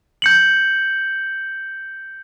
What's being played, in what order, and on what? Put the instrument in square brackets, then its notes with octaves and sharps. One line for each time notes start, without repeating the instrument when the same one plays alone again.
[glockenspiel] G6 C#7 F#7